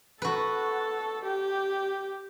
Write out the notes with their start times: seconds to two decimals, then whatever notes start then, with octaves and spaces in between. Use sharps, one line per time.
0.22 F#4 A4 B4
1.25 G4